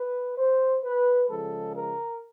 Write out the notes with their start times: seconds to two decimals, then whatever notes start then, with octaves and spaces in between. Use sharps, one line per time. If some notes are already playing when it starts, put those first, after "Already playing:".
Already playing: B4
0.37 C5
0.84 B4
1.29 C#3 F3 G#3 A4
1.76 A#4